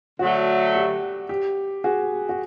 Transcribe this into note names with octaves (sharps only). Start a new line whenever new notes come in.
D3 F#3 A3 F#4
G4
G4
F#4 G#4
F#4